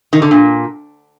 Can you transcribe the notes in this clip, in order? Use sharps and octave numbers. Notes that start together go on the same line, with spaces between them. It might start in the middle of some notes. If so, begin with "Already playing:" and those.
D#3
D3
A#2